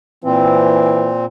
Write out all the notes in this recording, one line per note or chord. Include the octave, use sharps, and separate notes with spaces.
A#2 E3 C4